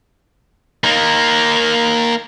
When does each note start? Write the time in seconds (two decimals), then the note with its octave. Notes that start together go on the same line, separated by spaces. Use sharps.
0.84 A#3 D#4